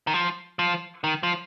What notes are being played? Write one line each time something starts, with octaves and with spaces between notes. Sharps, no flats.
D#3
F3
F3
D#3
F3